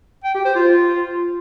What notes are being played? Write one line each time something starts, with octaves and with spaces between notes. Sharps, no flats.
G5
G4
C5
F4